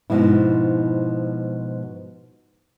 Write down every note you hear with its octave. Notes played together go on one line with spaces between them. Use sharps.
G#2 B2 F3 E4